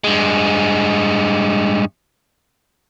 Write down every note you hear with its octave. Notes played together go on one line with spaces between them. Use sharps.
G2 G#3